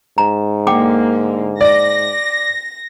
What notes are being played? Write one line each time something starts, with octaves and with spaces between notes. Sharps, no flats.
G#2 A#5
D3 A#3 F#5 G5 D6
D5 A#6